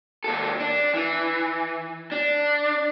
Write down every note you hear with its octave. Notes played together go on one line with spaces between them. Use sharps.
D#2 A4
D4
E3
D4